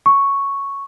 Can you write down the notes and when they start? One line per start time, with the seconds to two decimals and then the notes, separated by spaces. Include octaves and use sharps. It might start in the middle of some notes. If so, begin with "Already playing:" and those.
0.06 C#6